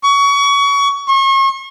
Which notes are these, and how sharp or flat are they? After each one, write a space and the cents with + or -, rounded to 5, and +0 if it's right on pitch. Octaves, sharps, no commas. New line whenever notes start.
C#6 +25
C#6 -40